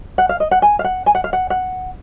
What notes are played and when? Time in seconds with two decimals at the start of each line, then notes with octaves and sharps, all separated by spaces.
0.18 F#5
0.29 F5
0.40 D#5
0.51 F#5
0.62 G#5
0.79 F5
0.84 F#5
1.06 G#5
1.15 F#5
1.24 F5
1.33 F#5
1.50 F#5